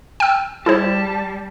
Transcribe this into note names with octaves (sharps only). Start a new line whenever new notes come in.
G5 E6
G3 E4 G#4 C5 A5